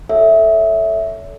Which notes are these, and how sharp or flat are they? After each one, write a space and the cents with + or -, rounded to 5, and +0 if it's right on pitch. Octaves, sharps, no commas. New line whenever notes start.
A4 +0 C#5 +35 E5 -5